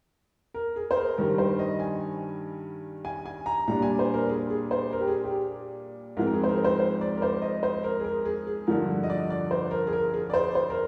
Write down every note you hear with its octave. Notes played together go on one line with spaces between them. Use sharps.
A#4
G#4
C5
A#4
G2 D#3 G3 A#4
C5
D#5
G#5
G#5
G#5
A#5
A#2 G3 D4 A#5
G#5
C5
A#4
G#4
G#4
C5
A#4
G4
G#4
G4
G#2 F3 G#3 C4 A#4
A#4
G#4
C5
A#4
C5
C5
D5
A#4
C5
D#5
C5
A#4
G#4
A#4
G#4
G#4
G2 D3 F3 A#4
D#5
D5
D5
C5
A#4
G#4
A#4
G#4
D5
C5
C5
A#4